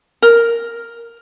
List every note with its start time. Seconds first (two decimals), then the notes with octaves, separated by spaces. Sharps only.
0.22 A#4